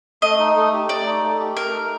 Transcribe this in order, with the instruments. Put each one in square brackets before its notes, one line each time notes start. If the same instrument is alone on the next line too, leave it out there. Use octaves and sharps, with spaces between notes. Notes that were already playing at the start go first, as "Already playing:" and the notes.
[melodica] A3 [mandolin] D#5
[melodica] D#4
A3
G4
[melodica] A3 [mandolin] D5
[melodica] D#4
A3
G4
[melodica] A3 [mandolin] A#4
[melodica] D#4